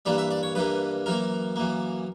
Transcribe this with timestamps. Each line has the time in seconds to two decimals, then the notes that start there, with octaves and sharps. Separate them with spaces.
0.05 G2 E3 G3 A#3 D5
0.18 E5
0.31 D5
0.43 C#5
0.55 G2 E3 G3 A#3 B4
1.06 F#2 E3 A#3 A#4
1.56 F#2 E3 A#3